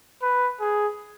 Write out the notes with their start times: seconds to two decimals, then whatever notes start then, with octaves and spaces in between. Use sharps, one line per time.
0.22 B4
0.60 G#4